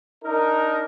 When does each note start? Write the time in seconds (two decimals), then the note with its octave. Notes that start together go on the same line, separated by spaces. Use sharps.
0.24 D4 D#4 A#4